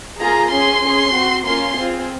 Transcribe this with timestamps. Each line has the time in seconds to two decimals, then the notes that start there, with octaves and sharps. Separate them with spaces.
0.18 A#3 F4 G#4 A#5
0.50 C#4 G#4 C6
0.82 C#4 G#4
1.14 C4 F#4
1.45 A#3 C#4 F4 C6
1.77 C4 F4 G#4